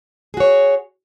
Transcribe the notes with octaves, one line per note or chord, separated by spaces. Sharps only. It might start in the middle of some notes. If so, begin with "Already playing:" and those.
F#4 G#4 C#5